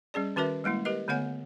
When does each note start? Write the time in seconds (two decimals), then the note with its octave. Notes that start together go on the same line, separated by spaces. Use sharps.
0.14 G3 C#4 G#4 D5
0.36 D#3 C#4 F#4 A#4 B4 E5
0.64 G3 G#3 A#3 E4
0.85 G4 A#4 B4 D#5
1.08 D3 A3 B3 C#5 F#5 G#5